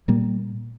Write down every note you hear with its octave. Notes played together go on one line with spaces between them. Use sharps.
A#2 G3 A#3